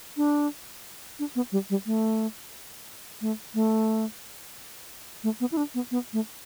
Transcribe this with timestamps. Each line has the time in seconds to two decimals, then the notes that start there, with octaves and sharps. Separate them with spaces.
0.17 D4
1.19 D4
1.36 B3
1.52 G3
1.70 G3
1.86 A3
3.21 A3
3.54 A3
5.24 A3
5.40 B3
5.52 E4
5.57 D4
5.75 B3
5.91 B3
6.13 A3